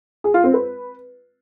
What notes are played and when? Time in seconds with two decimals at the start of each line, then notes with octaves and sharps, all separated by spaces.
0.24 G#4
0.34 F4
0.44 C4
0.54 B4